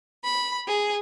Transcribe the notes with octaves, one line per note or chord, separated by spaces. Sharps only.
B5
G#4